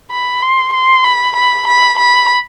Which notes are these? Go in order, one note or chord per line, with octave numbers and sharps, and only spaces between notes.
B5
C6
C6
B5
B5
B5
B5